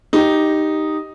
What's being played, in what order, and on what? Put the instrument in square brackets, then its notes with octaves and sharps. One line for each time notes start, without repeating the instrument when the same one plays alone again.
[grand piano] D#4 G4